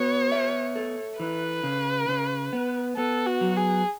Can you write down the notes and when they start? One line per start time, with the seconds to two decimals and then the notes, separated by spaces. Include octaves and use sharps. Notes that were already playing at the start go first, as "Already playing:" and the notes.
Already playing: B3 F#4 C#5
0.32 E5
0.76 A4
1.20 E3 B4
1.63 C#3
2.08 C#3
2.53 B3
2.97 B3 A4
3.26 F#4
3.41 F#3
3.56 G#4